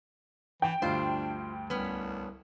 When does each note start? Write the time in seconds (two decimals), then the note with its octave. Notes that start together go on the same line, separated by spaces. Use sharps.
0.62 E3 G5
0.82 D2 G2 D4 F4 C5
1.70 C2 B3 C#4